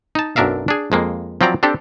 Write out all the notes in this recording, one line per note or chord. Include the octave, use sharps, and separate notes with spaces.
D#4 A5
B1 F#2 D4 A#4 E5 F5
D4 G#4
F2 G#3 A#3
F3 F#3 C4 D5 A#5
C4 D4 G4 A4